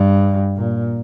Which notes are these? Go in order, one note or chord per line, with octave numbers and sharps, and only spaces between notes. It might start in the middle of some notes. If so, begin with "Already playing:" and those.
Already playing: G2
A#2